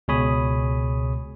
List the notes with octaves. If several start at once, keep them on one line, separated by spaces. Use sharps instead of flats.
C#2 B2 G#4 C#5 B5 D#6